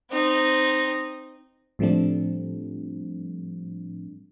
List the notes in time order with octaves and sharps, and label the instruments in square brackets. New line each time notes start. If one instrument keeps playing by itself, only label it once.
[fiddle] C4 D#4
[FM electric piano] A2 F3 G3 A3 C4 D4